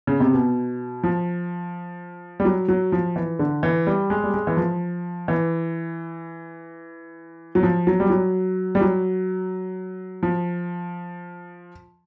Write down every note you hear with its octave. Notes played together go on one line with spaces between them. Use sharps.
C#3
C3
B2
F3
G3
F#3
F#3
F3
E3
D3
E3
G3
G#3
G3
G#3
E3
F3
E3
F#3
F3
F#3
G3
F#3
G3
F#3
F3